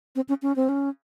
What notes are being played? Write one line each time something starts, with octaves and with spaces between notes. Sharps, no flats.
C4
C#4
C#4
C4
C#4